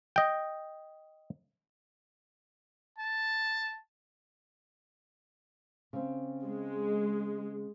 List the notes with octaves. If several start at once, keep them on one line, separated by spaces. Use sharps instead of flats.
D#5 G5
A5
C#3 C4
G#3